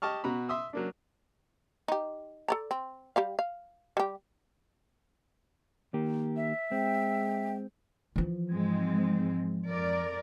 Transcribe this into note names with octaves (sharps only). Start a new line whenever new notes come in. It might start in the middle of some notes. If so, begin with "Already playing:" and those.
G4 D#5 A5 C#6 F6
B2 F#4 A#5 B5
E5 C6 D#6 E6
F#3 A#3 D4
D#4 G4
A4 D5 A#5
C4
G3 G4 F5
F5
G3 G4
D#3 A#3 G4
E5
G#3 C4 G5
E3 F3
G#2 G#3 C4
F2 A#4 D5